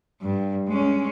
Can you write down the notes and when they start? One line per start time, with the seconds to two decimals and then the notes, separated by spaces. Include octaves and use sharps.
0.22 G2
0.68 G#3 C#4